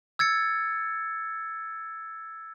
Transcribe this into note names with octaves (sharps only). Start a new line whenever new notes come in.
E6 G#6 A6 C#7